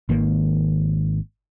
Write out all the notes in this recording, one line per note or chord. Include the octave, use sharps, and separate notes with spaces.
G#1 D#3 A#3